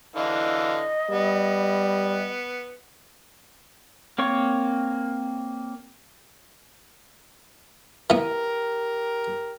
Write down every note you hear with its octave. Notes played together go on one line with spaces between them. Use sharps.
D3 E3 D#5 F5
G3 B3
A#3 C4 C#5 C#6
E3 B3 G4 A#4